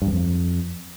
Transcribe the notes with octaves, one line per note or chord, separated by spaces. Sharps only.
G2
E2
F2